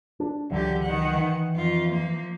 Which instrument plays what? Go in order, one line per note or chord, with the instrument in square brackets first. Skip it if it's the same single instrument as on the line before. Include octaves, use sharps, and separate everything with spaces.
[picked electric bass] D4
[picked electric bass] C#2 E3 F#3 [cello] D3 G4
[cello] D#3 F#5
[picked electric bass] E3
[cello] F2 F4
F3 A#3